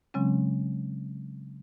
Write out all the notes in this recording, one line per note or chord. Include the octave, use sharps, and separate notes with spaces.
C#3 F#3 G#3 C4 C#4